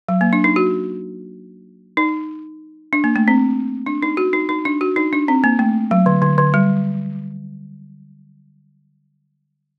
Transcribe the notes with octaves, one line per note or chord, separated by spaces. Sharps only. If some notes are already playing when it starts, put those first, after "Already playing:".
F#3
A#3
D4
D#4
F#4
D#4
D4
A#3
A3
C4
D4
D#4
F#4
D#4
D#4
D4
F#4
D#4
D4
C4
A#3
A3
F#3
D3
D3
D3
G3